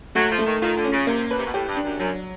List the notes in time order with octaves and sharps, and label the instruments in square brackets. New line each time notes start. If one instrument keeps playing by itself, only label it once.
[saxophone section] F#3 [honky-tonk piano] A3
[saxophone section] F3
[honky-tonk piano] A3
[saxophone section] D#3
[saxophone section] D#3 [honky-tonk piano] F4
[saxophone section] D3
[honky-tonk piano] C#4
[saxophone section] C#3
[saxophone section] C3 [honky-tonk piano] A#3
[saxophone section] B2 [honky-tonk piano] B4
[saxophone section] C3
B2
[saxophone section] A2 [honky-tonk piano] G4
[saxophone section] G2
[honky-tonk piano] D4
[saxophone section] F#2
[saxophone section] F#2 [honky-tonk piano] F#3